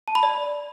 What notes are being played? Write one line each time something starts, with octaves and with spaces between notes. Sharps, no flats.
A5
B5
D5